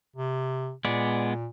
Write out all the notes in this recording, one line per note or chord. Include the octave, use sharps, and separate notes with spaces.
C3
A#2 G#3 B3 D5